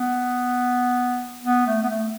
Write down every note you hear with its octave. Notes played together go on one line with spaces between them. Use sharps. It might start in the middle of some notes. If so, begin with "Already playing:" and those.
Already playing: B3
B3
A3
B3
A3